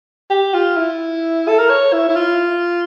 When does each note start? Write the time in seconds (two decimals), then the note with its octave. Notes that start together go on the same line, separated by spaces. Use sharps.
0.30 G4
0.54 F4
0.77 E4
1.48 A4
1.59 A#4
1.70 C#5
1.93 E4
2.09 E4
2.16 F4